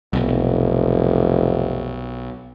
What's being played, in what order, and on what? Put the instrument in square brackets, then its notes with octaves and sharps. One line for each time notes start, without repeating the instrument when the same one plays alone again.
[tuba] F1 [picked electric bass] B1